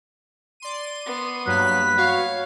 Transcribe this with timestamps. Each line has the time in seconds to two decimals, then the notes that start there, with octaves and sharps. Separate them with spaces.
0.60 D5 C6 D#7
1.06 B3
1.47 G2 F#3 A#3 B4 B6
1.98 F#4 C#5 F5